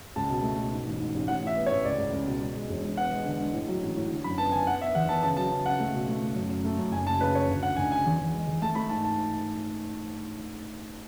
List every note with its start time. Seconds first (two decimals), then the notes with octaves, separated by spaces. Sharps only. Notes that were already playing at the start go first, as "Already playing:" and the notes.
0.16 C#2 A5
0.30 B2
0.43 A3
0.58 B2
0.72 G#2
0.86 A1
1.00 G#2
1.14 A1
1.28 A1 F#5
1.42 A2
1.47 E5
1.56 B3
1.66 C#5
1.71 A1
1.85 C#2 D5
1.98 C#2
2.12 C#2
2.26 B2
2.42 G#3
2.55 G#3
2.69 E1
2.84 E1
2.97 B3 F#5
3.11 G#3
3.25 D3
3.39 G#3
3.53 A2
3.68 F#3
3.82 A1
3.96 A2
4.11 D3
4.24 F#2 B5
4.38 B3 A5
4.52 D3 G#5
4.67 B3 F#5
4.81 B3 E5
4.95 E2 F#5
5.09 B3 A5
5.23 C#3 A5
5.37 F#3 A5
5.51 C#3
5.66 C#3 F#5
5.80 A3
5.94 B2
6.08 A3
6.22 A3
6.35 F#2
6.49 F#2
6.64 A3
6.78 F#2
6.92 F#1 G#5
7.06 C#3 A5
7.21 C#3 B4
7.34 C#3 C#5
7.48 D2
7.63 D2 F#5
7.76 D2 G#5
7.91 C#3 G#5
8.06 E2
8.20 E2
8.34 G#3
8.47 E2
8.62 A3 A5
8.75 A3 B5
8.90 G#2 A5
9.04 A5